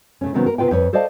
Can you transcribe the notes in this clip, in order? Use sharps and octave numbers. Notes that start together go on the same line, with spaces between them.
C#3 A3 C#4
C3 D#3 F#3 B3 C#4
A#4
C3 B3 F4 B4 G5
F2 B4 C#5
A4 C5 D5 D#5 F5 A5